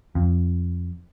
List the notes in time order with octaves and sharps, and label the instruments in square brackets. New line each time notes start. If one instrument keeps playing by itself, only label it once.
[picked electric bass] F2